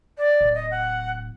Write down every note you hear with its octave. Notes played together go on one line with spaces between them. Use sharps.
D5
D1
D#5
F#5